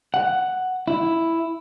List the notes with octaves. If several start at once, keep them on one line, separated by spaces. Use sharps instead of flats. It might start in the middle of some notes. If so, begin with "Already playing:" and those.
F#5
E4